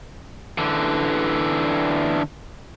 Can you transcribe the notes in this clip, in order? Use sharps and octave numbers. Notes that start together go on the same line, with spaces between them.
D3 E3